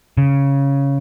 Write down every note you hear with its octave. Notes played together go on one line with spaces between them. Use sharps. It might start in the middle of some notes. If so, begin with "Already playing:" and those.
C#3